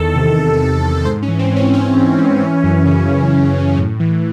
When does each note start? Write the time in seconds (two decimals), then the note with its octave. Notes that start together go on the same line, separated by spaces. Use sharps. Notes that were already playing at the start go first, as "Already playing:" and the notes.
Already playing: E2 D#3 A4
0.15 C3
0.38 E2
0.60 D#3
0.83 E2
1.05 G#2 C5
1.22 C#4
1.28 E3
1.39 C4
1.51 E3
1.56 C#4
1.74 G#2 C#4
1.97 G#2
2.18 E3
2.41 E3
2.64 F#2
2.86 C#3
3.10 F#2
3.32 E3
3.55 F#2
3.77 A2
4.00 E3